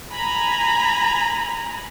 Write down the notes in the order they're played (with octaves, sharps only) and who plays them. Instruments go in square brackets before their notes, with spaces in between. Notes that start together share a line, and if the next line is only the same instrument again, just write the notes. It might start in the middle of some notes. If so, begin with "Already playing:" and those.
[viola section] G#5 A#5 B5